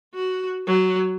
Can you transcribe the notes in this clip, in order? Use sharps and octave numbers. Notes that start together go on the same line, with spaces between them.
F#4
F#3